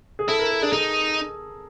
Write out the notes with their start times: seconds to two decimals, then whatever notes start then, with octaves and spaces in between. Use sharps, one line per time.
0.19 G#4
0.28 E4 A4
0.39 A#4
0.51 A#4
0.62 D4 G#4
0.73 D#4 G#4